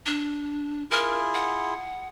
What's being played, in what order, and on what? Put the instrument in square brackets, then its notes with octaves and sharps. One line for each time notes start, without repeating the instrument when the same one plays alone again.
[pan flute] D4
[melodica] E4 F4 G#4 [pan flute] A#4
[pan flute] F#5